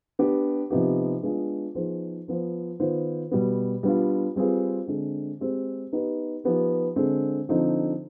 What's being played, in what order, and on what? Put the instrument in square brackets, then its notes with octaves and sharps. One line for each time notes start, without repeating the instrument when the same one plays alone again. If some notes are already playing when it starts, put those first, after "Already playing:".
[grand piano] B3 D4 G4
C3 F3 B3 D#4 G4
G#3 B3 D4 F4 G#4
F3 B3 D#4 G#4 C5
F3 B3 F4 C5
D#3 B3 F4 C5
B2 G3 B3
G3 B3 D4 F4
G3 C4 F4 G#4 B4
D3 G#3 C4
G#3 C4 G4 C5
B3 D#4 G4 B4
F3 B3 D#4 G4 B4
D3 G#3 C4
D3 F3 C4 D#4